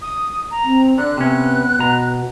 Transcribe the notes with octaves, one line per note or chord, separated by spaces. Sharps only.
D#6
A#5
C4
D3 D5 F#6
C3 B3 C#4
B2 A#5